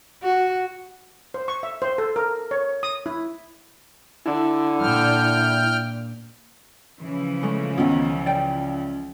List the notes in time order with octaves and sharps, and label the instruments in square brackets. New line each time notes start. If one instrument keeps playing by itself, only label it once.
[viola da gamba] F#4
[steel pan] C5
C#6
E5
C5
A4
A#4
C#5
D#6
E4
[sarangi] D3 [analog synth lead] E4
[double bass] A#2 [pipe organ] G5 F6
[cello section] C#3 E3 F3
[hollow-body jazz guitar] G#3 A3
[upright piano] C#2 [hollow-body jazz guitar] D#3 B3
[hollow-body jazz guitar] D5 G5